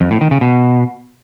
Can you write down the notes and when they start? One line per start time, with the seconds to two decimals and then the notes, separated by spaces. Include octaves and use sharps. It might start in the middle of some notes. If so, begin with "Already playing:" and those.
0.01 F2
0.11 A2
0.21 D#3
0.31 C#3
0.41 B2